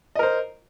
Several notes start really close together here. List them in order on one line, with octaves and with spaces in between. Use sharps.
D#5 A#4 C5